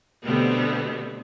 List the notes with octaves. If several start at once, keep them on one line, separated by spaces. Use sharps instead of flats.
B2 D3 G3 A3 B3 C4